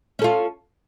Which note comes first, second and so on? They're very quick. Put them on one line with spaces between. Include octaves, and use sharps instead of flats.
C#4 A4 F4